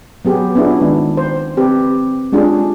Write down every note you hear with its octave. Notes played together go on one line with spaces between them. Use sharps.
F#3 B3 G4 G#4
B3 C#4 D4 E4 F4 G#4
D#3 G#3 B3 D4
C5
C4 G4 B4
G#3 C#4 D4 F4 G4 G#4